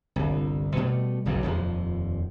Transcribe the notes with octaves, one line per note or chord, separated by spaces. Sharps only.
G1 C2
B2 G3 A3
F#1 B1 G2 B2
D#1 F2 F3